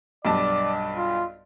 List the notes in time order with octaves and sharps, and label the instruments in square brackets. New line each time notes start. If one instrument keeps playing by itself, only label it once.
[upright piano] B1 G2 A5 [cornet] D5
[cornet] F4